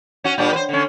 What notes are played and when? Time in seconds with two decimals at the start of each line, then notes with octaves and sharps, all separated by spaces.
0.24 C#4 F#4
0.38 A#2 G3 D4
0.53 B4 C5
0.69 D3 C#4